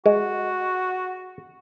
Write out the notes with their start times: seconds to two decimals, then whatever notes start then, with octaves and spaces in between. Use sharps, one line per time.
0.06 G#3 F#4